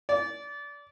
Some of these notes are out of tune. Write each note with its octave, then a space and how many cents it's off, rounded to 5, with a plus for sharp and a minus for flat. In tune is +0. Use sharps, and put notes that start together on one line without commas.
D5 -25